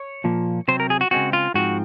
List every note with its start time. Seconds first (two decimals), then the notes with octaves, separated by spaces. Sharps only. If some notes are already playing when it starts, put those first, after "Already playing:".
Already playing: C#5
0.24 A#2 F3 A#3
0.68 C3 F#3 C4 C5
0.80 A#4
0.90 G#4
1.01 F#4
1.11 C#3 G#3 C4 F#4
1.33 F4
1.54 G#2 F3 C4 F#4